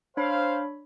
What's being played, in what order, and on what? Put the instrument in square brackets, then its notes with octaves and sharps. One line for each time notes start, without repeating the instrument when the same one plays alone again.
[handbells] D4 C#5 B5 [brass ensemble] C5 F5